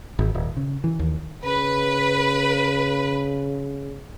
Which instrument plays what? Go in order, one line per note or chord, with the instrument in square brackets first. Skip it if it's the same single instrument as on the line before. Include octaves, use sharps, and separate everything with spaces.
[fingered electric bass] G#1
D#1
C#3
E3
D#2
[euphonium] C#3 [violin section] B4